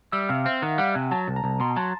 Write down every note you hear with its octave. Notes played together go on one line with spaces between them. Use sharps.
G3 E5
C3 F5
C4 F5
D#3 F#5
G3 F#5
C3 G#5
F#3 A5
C2
A#5
C2
B2 C6
F#3 A5